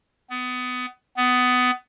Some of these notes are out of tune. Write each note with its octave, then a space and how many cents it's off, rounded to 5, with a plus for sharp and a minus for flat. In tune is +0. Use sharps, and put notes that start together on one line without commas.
B3 +25
B3 +20